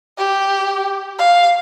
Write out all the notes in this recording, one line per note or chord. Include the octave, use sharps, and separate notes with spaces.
G4
F5